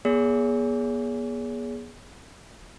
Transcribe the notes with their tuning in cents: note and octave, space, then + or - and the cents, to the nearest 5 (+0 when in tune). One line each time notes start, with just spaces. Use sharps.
B3 -45 G#4 +0 C#5 +40